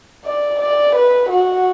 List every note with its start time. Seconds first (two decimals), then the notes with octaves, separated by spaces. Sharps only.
0.25 D5
0.60 D5
0.95 B4
1.29 F#4